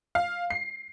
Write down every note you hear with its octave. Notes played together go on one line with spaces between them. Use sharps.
F5
C7